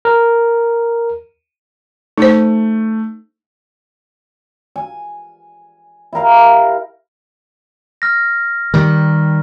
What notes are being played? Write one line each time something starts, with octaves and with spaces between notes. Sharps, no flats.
A#4
A3 D#4 C5
G#5
E4 G4 A#4 F5
F6 A#6
D#3 G3